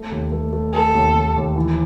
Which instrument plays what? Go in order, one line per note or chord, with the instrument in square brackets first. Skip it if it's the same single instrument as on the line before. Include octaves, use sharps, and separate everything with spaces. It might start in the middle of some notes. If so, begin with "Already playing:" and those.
Already playing: [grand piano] A3
D#2
A3
A3
[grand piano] A3 [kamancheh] A4
[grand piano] D#2
D#2
D#2
E3